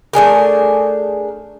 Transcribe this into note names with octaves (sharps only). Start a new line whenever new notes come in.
A3 D4 G#4 A#4